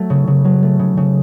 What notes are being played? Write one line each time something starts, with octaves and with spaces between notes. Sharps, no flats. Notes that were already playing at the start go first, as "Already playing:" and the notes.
Already playing: F#3 A3
C#3
C#3
F#3
A3
C#3
C#3